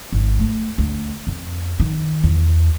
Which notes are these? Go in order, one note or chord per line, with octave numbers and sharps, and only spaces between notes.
G#1
A3
D2
F2
D#3
E2